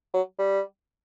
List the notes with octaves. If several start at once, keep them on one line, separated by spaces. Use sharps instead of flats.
F#3
G3